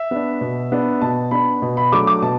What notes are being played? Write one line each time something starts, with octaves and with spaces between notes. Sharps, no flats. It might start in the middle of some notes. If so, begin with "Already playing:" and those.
Already playing: E5
B3 D4
B2
B3 D4
B2 A5
B3 D4 B5
B2
B5
F#3 A3 D4 D6
D6
B2 A5